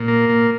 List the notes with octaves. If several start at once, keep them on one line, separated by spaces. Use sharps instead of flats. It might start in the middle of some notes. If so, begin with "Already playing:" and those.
Already playing: A#2
A#3
A#2